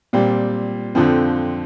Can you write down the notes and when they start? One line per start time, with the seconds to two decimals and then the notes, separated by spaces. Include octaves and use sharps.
0.13 A#2 G3 C4
0.95 F2 D3 F3 C4